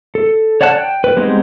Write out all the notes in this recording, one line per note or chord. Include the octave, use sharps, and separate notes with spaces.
A4
C#5 D5 F#5 A5 F#6
G5
B4
G3 G#3 B3 C4 D#4